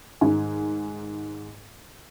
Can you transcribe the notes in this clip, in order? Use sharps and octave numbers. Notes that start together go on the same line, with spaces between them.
G#2 D#3 G#5